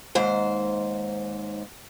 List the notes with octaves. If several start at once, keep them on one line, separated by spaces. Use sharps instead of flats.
D#2 G#2 C5